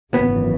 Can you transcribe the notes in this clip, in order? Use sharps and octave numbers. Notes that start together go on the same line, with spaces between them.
G#1 F#2 C#3 E3 B3